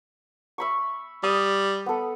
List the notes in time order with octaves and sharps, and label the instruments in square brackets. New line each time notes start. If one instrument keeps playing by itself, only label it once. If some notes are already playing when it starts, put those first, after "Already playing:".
[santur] E5 B5 C#6
[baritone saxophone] G3 [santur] D#6
[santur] B3 A4